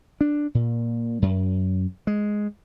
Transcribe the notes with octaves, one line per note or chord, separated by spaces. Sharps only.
D4
A#2
F#2
G#3